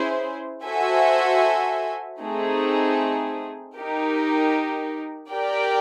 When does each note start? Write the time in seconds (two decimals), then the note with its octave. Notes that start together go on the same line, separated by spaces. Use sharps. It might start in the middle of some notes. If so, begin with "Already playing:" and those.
Already playing: C#4 E4 G#4 C5
0.65 F#4 A4 C5 E5 G#5
2.21 A3 C4 D#4 G#4
3.76 D#4 G4 A#4
5.31 G4 A#4 D5 G5